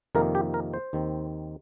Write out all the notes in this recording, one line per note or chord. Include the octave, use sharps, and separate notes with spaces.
F2 C3 D#3 A#3 A#4
G4
A#4
C5
D#2 D#3 C4